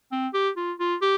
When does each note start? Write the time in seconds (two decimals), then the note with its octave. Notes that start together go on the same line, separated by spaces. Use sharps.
0.12 C4
0.34 G4
0.56 F4
0.79 F4
1.02 G4